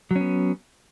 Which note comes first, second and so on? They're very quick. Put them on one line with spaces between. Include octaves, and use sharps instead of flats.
F#3 C#4 B3